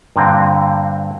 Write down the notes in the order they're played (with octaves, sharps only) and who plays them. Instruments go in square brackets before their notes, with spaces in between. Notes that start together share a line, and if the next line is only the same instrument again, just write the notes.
[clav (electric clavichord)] G2 A#2 D3 C4